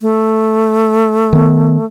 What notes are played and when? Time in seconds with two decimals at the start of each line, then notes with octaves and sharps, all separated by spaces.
0.01 A3
1.33 D#3 B3